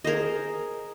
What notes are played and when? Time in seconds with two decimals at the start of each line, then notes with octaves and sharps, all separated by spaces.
0.04 G#4 A#4 C5 D#5